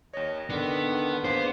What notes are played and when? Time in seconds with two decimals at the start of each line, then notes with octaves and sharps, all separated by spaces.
0.13 D#2 C#5 D#5
0.50 D3 D#3 B3 D4
1.24 A#3 B3 D4 G#4 C5